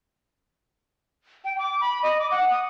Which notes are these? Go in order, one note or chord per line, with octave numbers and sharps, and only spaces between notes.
G5
D6
B5
D#5
D6
F#5
D#6